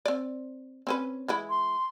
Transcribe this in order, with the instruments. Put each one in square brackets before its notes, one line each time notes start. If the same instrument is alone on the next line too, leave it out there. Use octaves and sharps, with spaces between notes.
[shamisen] C4 D5
C4 C#4 B4
E3 G#3 E4
[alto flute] C6